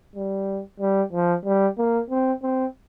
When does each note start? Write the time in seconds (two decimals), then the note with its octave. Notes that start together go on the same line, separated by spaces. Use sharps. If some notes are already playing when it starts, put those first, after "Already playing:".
0.15 G3
0.80 G3
1.13 F3
1.45 G3
1.78 A#3
2.10 C4
2.43 C4